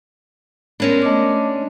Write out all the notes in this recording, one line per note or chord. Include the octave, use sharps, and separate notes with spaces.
G#3 B3 C#4 D4 A#4
A3 D#5 D6